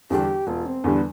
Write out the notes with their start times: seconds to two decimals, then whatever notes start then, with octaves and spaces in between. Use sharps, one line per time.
0.10 E2 D3 G3 D4 G4
0.47 E1 F4
0.66 C4
0.84 E2 D3 G3 B3 D4